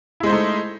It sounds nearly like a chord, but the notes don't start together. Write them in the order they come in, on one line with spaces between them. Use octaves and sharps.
E4 G#3 C5 D#4 A3